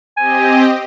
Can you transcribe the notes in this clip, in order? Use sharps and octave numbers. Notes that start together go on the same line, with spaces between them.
C4 G4 D#5 G#5